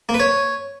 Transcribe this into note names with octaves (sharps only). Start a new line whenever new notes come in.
A#3
B4
C#5